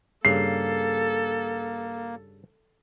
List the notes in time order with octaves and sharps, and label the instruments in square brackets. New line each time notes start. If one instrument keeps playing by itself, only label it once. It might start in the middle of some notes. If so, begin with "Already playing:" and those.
[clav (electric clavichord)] G2 C#3 [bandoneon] A#3 [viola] A4 [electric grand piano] C7